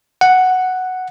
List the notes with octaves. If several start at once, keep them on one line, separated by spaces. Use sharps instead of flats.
F#5